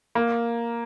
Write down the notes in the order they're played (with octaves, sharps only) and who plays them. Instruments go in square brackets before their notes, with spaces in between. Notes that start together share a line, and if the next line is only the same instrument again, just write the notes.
[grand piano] A#3